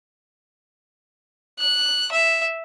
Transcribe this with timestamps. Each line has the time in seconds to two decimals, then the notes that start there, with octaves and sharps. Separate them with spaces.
1.59 F#6
2.12 E5